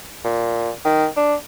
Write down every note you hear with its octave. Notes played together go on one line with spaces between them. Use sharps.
A#2
D#3
D4